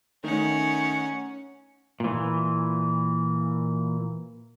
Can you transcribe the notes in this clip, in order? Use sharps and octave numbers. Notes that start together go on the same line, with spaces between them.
D#3 A3 C#4 D#4 F#5
A#2 E3